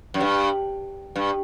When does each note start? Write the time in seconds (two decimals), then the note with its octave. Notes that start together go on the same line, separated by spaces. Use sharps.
0.14 F#2
0.20 G2
1.16 G2